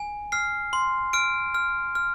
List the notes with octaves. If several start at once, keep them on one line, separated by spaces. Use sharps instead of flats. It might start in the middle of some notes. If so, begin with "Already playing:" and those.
Already playing: G#5
F6 C7
C6
F6 D7
F6
F6